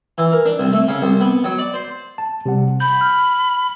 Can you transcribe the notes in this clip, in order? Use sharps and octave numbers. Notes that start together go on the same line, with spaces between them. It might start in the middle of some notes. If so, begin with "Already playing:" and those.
E3
A#4
D4
C2
A3
C#3
C2
B3
F#3
D5
C5
A5
C3 G3 F#5
B5 G6
F6